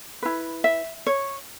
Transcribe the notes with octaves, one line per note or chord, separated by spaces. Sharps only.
E4 B4
E5
C#5